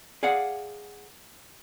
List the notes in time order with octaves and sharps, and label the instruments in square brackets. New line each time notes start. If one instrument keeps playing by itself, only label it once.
[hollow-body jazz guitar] G#4 D5 F5 F#5